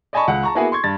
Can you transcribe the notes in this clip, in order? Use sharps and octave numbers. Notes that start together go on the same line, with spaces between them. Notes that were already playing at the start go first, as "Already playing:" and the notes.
D5 D#5 G#5 A5 B5 C#6
C#2 F#5
A5 A#5 C#6
A#3 B3 E4 F#4 G#4 B4
C6 C#6 G#6
G2 A6